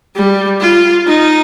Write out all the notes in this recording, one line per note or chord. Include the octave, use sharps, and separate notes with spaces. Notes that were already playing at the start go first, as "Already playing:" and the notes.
G3
F4
D#4